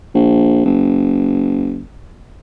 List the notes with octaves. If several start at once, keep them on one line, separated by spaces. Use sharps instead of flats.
A#1
F#1